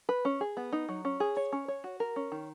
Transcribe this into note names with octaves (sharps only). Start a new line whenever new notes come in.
B4
C#4
G#4
B3
D#4
F#3
C#4
G#4
C#5
C#4
C#5
F#4
A#4
C#4
D#3